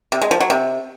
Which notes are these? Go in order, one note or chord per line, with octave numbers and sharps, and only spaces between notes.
C3
G#3
F3
F#3
C3